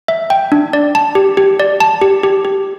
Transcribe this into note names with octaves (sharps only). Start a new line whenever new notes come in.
E5
G5
D4
D5
A5
G4
G4
D5
A5
G4
G4
G4